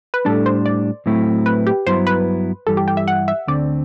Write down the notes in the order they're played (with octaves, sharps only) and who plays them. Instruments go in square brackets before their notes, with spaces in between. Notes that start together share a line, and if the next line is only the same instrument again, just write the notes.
[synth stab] B4
[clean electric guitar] A2 G3 D4 [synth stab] A4
[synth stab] C5
D5
[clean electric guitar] A2 F#3 A3 C4 E4
[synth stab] B4
G4
[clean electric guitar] G2 F#3 B3 E4 [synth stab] C5
[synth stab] B4
[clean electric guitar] G2 E3 G3 [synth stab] A4
[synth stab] G4
G4
E5
F#5
E5
[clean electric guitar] D2 D3 A3 C4 [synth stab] D5